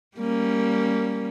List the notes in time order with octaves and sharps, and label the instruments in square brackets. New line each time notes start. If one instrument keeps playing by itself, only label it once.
[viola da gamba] G3 A#3 C#4